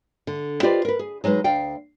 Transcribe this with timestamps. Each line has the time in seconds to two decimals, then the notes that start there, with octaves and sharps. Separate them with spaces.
0.27 D3
0.63 F4 G4 B4 C5 D5 D#5
0.85 A#4 B4
0.99 G#4
1.24 F#3 G#3 D#4 B4
1.44 D2 D5 F5 G5